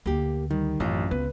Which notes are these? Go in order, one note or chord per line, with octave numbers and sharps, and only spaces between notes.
D2 A#3 G4
D#3 G3
A1 F#2 C4 F4
C#2 B3 B4